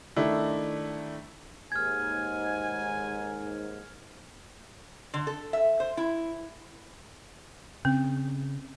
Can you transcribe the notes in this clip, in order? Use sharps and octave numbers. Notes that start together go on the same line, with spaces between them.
D#3 A3 D4 E4
D#2 G#2 G#5 F6 G#6
D3
A4
E5
C5
E4
C#3 C4